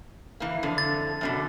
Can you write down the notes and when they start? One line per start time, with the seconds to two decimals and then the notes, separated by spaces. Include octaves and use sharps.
0.40 E3 A#3
0.63 F2 D3
0.78 A6
1.21 F#2 B2 D3